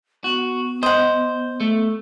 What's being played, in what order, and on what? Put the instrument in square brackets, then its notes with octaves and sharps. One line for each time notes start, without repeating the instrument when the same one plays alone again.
[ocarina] B3 [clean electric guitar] F#4
[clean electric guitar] C5 [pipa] D#5 F#5
[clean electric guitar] A3